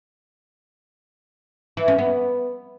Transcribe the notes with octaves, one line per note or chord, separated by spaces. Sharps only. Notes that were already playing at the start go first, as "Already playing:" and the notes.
E3
C#4
B3